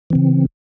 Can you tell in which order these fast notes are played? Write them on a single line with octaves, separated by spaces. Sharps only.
E3 C4 C#3